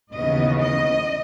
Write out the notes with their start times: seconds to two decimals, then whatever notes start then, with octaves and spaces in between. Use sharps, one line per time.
0.13 D#2 C#3 E3 B3 D#5
0.60 D#5